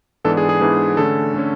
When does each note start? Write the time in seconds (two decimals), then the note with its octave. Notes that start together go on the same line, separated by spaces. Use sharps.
0.24 G#2 E3 B3 D4 A4
0.37 G#4
0.49 G#4
0.61 G#2 E3 B3 D4
0.97 D3 A3 C#4 A4
1.34 D3 A3 C#4